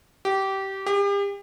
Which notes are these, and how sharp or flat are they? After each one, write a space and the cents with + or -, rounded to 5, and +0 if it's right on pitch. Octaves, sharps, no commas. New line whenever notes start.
G4 -20
G4 +40